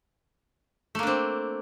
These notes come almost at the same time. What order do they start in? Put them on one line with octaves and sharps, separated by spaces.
A3 A#3 D4 C4